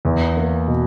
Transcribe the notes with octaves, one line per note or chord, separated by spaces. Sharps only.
E2
A#3
B2